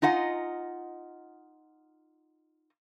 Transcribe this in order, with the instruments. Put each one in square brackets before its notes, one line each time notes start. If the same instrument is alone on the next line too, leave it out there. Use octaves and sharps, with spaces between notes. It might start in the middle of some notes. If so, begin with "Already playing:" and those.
[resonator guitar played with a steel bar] D#4 F4 D#5 F#5 G#5